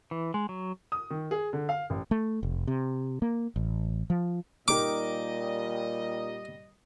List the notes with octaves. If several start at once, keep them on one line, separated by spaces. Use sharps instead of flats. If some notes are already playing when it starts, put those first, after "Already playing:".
E3
G#3
F#3
D#6
D#3
G#4
D3
F5
A1
A3
F1
C3
A#3
A1
F3
A#2 G3 D#4 G4 A#4 D#5 D6